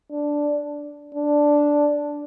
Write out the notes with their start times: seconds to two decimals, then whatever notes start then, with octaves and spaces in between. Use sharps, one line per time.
0.11 D4
1.15 D4